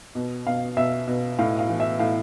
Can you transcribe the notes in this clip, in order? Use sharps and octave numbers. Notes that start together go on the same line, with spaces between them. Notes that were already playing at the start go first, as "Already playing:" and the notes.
B2
B2 F5
B2 E5
B2
A2 F5
F5
E3
E5
A2 F5